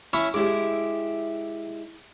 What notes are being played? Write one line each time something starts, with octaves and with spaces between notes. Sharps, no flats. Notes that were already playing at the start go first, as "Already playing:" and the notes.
C#4 E4 C#5
G#3 E4 G4 D6